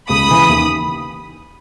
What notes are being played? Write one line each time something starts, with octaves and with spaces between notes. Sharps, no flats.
C#2 B5 D#6
C#3 E3
D#2